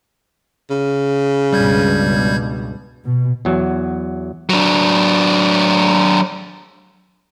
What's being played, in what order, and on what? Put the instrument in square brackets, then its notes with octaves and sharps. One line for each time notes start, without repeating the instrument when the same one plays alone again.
[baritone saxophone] C#3
[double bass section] C#2 G2 B2 [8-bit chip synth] G3 G6 G#6
[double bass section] B2
[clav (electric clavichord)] E2 F#3
[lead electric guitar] F#3 D4